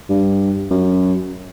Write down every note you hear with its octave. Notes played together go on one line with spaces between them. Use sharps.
G2
F#2